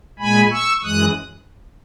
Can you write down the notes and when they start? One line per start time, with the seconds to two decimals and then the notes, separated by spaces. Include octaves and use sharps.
0.19 A#2 G#3 G#5 B5
0.50 C#6 E6
0.83 F#2 E3 G#3 D#6 F#6